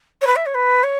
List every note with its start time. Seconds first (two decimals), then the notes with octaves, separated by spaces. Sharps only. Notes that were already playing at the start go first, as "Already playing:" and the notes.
0.21 C#5
0.26 B4
0.36 E5
0.46 C#5
0.54 B4
0.83 C#5